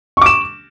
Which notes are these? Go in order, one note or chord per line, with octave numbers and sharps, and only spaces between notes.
C#6 D6 E7